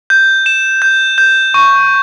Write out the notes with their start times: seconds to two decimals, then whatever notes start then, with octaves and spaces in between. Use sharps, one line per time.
0.10 G6
0.46 E7
0.82 G6
1.18 G6
1.54 C#6